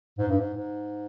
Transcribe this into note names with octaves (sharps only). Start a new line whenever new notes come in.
G#2
G2
G#2
G#2